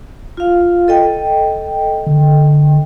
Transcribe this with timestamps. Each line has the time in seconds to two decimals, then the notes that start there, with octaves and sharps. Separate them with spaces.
0.37 F4 F5
0.88 A4 D#5 G5
2.06 D3